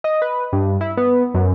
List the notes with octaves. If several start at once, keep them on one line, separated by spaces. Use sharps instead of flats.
D#5
B4
G2
E4
B3
F#2